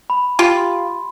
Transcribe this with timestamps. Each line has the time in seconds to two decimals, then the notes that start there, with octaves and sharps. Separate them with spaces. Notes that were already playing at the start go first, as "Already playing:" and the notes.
0.10 B5
0.39 F4 G4 C6